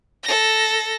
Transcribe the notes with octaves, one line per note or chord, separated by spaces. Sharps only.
A4 A#6